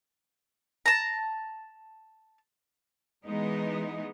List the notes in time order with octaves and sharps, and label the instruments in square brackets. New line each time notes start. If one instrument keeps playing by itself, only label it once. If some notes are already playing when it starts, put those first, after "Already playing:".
[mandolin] A5 A#5
[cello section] E3 G#3 B3 D#4